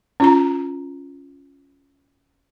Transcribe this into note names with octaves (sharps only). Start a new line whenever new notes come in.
C#4 F4 A#5